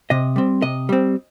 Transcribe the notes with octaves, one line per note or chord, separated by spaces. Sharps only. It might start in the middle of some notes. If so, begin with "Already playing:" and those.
C3 D#5
G3 C4
C3 D#5
G3 C4